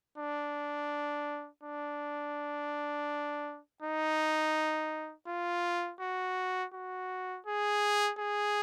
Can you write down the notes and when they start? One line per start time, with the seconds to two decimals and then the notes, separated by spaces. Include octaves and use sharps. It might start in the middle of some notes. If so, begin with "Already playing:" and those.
0.18 D4
1.63 D4
3.82 D#4
5.28 F4
6.00 F#4
6.73 F#4
7.46 G#4
8.19 G#4